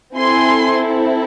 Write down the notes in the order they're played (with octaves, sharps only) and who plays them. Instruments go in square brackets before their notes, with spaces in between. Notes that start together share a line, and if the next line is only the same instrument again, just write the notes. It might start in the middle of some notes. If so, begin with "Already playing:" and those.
[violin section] C4 E4 A4 G#5 C6